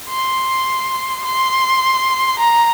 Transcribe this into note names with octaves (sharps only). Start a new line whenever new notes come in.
C6
C6
A#5